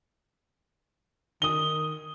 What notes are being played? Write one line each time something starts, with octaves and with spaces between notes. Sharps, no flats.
D#3 D#6 G7